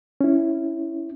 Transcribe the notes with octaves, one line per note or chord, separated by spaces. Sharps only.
C#4 E4